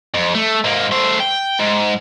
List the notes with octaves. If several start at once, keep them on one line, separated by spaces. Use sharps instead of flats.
F2
A3
G#2 A#3
A3 C5
G5
G#2